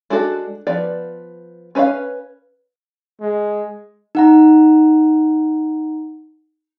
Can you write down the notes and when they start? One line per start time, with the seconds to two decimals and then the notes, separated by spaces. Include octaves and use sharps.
0.10 G#3 D4 F#4 A4
0.67 F3 B3 B4 D5
1.75 C#4 B4 C#5 D#5 F5
3.21 G#3
4.15 D#4 F#5 A#5